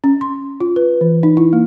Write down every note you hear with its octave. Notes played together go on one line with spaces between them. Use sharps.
C#4
C6
F4
B4
E3
D#4
E4
A#3